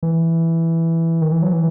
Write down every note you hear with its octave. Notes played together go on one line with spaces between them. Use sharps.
E3
D#3
E3
F#3
E3